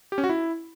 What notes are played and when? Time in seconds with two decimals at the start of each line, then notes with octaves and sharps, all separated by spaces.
0.12 G4
0.18 C#4
0.24 F#4
0.29 E4